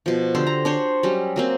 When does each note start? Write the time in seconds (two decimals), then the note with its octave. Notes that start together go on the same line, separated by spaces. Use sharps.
0.06 B2 F3
0.35 D3 G4 A4 C5
0.47 A#5
0.65 D4 C5 C#5
1.03 F#3 G3 C#4 G4
1.36 F#3 A#3 C4